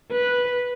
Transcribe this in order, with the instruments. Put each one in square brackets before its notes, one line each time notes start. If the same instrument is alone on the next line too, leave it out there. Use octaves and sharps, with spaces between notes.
[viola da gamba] B4